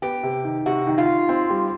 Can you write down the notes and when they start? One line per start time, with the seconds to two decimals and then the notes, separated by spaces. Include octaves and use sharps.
0.02 B3 G4
0.23 C3
0.44 D#3
0.66 C3 F#4
0.87 D#3
0.98 F4
1.08 D#3
1.29 C4
1.50 G3